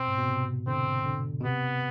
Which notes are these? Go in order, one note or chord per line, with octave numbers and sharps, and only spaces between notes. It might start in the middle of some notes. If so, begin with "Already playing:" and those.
Already playing: B2 C4
G#2
B2
C3
D3 C4
D3
B2
C3 B3